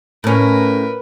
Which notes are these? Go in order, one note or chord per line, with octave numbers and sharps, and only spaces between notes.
A2 C#4 A#4 B4